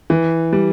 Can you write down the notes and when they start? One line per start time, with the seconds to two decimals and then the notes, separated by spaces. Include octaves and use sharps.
0.10 E3
0.53 G3